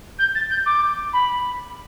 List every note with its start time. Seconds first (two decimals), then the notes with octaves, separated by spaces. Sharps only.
0.19 G6
0.35 A6
0.50 G6
0.66 D6
1.13 B5